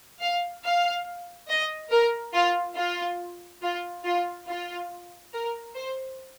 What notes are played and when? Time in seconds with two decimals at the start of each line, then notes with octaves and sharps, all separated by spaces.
0.22 F5
0.65 F5
1.49 D#5
1.91 A#4
2.34 F4
2.77 F4
3.62 F4
4.04 F4
4.47 F4
5.33 A#4
5.75 C5